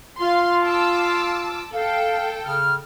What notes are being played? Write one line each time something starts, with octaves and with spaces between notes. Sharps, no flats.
F4 F5 C6
A5 D6 E6
A4 F5 G5
C#3 F6